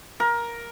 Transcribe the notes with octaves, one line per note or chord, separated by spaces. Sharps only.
A#4